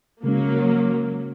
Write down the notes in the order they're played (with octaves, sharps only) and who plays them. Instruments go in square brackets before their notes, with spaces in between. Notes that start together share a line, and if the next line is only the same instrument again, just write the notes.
[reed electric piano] C#3 G#3 C#4 [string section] F#3 A#3